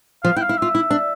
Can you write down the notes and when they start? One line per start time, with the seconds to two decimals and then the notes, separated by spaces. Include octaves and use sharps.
0.23 F3 F5
0.36 E4 G5
0.41 F5
0.49 E4
0.58 F4 E5
0.75 E4
0.90 D4